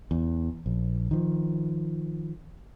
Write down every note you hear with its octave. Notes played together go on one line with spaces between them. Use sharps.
E2
A#1
D#3 F3